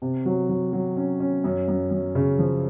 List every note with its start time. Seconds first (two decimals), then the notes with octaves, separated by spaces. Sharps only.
0.02 C3
0.25 F#3
0.49 F#3
0.73 F#3
0.97 C#4
1.20 C#4
1.44 F#2
1.68 F#2
1.91 F#2
2.15 C#3
2.39 F3